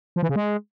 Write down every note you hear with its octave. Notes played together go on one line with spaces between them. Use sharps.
F3
E3
C#3
G#3